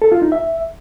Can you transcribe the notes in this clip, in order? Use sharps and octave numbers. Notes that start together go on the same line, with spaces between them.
A4
F4
D#4
E5